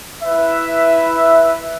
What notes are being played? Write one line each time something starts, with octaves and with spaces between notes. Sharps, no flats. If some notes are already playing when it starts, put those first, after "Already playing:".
E4 B4 E5